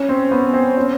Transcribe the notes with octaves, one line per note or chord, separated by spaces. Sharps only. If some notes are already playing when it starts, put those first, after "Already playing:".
Already playing: C#4
C4
B3
C4
C#4